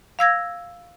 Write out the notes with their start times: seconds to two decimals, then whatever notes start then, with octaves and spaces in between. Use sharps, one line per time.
0.19 F5 E6 G#6 A#6